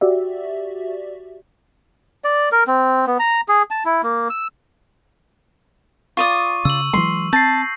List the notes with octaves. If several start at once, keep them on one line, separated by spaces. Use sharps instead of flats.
F#4 G4 D5 E5
D5
A#4
C4
B3
A#5
G#4
A5
E4
A#3
E6
F4 D5 C#6 D#6 D#7
C#3 E6 F#7
E3 F#3 G#3 C6
C4 A5 G6 A#6 C7